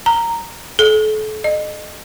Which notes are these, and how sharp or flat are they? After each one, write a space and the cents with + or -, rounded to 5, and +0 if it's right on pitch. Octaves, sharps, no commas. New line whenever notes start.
A#5 -10
A4 -35
D#5 -30